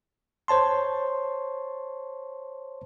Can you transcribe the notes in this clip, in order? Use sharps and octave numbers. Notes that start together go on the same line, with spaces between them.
C5 C#5 A5 C6